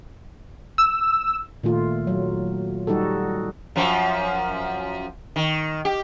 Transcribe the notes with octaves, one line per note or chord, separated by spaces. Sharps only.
E6
A#2 D#3 A3 F4
F#3
G3 D#4 F#4 G4 A4
F#2 F3
D#3
G4